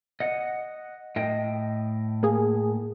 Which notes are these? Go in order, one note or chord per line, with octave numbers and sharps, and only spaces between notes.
D#5 F#5
A2 D#5 G5
A#3 G#4